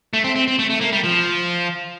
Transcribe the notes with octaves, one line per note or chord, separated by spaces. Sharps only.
A3
C4
C4
C4
A3
A3
A#3
G3
F3